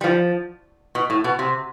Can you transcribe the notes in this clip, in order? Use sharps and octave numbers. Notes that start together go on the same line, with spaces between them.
G3
F3
B2
A2
B2
C3